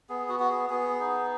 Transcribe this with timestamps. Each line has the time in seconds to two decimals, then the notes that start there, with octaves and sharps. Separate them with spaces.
0.09 B3 G#4
0.29 F#4
0.40 F#4
0.49 G#4
0.70 B3 G#4
1.00 D#4